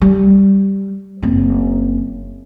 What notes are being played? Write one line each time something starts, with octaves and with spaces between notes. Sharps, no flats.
G3
F#1 C4